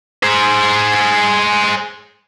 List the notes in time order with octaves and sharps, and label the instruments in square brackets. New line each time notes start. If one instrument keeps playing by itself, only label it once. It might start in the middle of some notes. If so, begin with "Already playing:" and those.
[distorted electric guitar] G#4 C5